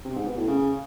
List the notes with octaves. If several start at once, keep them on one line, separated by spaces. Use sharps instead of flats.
C3
G#2
B2
A2
C#3